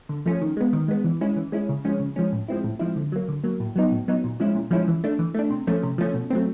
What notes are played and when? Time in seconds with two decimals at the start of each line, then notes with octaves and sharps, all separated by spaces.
0.09 D3
0.26 F3 A3 C#4
0.41 D#3
0.57 G#3 B3
0.73 D#3
0.88 G#3 B3
1.04 E3
1.21 G#3 C#4 E4
1.36 E3
1.52 G#3 C#4 E4
1.69 C#3
1.85 F3 G#3 C#4
2.00 C#3
2.16 F3 G#3 C#4
2.33 A2
2.48 F3 G#3 C4 E4
2.64 A2
2.79 F3 G#3 C4 E4
2.96 D3
3.12 F#3 A#3
3.28 D3
3.44 F#3 A#3
3.60 A2
3.76 F#3 B3 D#4
3.92 A2
4.08 F#3 B3 D#4
4.24 A#2
4.40 F3 G#3 C#4 E4
4.55 A#2
4.71 F3 G#3 C#4 E4
4.88 E3
5.04 A3 D4
5.19 E3
5.34 A3 D4
5.50 C3
5.67 F3 A3 C#4
5.83 C3
5.98 F3 A3 C#4
6.14 B2
6.30 F#3 A3 C4